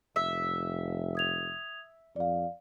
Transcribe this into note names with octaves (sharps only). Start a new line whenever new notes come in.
F1 E5
D#6 G#6 F7
F2 D5 F5